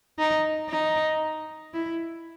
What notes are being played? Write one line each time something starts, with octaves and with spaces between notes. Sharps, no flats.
D#4
D#4
E4